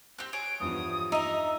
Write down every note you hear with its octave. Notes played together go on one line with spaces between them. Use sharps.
C4 G4 F#6 G6
G#4 C#5 D7
E2 G2 F3 D#6
D#4 D#5 E5 A#5